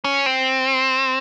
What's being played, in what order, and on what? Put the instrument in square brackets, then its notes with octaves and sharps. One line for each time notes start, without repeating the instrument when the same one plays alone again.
[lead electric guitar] C#4
C4